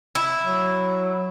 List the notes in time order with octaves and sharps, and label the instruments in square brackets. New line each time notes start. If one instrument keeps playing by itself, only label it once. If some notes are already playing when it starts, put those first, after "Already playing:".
[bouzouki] E4
[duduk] F#3